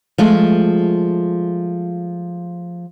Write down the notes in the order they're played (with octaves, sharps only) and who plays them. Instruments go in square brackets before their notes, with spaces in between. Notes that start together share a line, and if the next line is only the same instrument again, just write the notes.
[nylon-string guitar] F3 G#3 A3